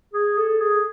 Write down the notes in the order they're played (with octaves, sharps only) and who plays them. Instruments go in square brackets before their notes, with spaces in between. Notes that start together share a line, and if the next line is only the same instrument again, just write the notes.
[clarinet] G#4
A4
G#4